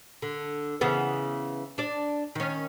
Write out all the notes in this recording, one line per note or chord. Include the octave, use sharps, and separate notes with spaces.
D3
C#3 E3 B3
D4 D5
D#3 C#4